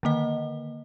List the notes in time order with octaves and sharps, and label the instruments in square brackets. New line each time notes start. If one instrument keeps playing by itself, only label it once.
[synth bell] D3 D#3 A#3 D#5